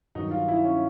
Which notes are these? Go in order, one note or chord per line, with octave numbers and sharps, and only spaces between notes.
G2 D#3 F#3 D#4
F4
E4
C#4